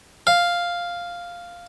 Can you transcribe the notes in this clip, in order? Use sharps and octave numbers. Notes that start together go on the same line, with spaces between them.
F5